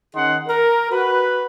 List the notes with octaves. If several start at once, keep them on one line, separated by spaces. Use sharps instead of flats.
D#3 C#4 D#4 G#4 F#5 C6
A#4
F#4 B4